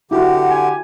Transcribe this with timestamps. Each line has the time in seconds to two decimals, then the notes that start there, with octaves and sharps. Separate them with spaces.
0.11 D3 E4 F#4 G4 F#5
0.50 G#5